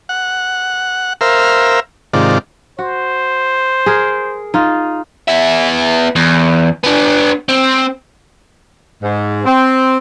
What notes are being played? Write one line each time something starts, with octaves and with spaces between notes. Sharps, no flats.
F#5
A#4 C5 E5 F5
G#2 C3 D#3 F4 D5
F#4 C5
G#4 A#4
D#4 F4
B3 E5
E2
B3 D4
C4
G#2
C4